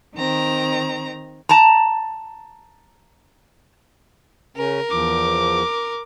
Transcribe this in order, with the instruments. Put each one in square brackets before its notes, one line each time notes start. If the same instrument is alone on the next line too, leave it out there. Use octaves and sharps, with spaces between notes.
[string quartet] D#3 C4 A#5
[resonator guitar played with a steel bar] A5 A#5
[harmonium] C#3 C#4 [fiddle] A#4
[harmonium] E2 F3 [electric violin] D6